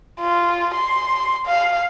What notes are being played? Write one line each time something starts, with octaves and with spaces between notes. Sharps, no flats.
F4
C6
F5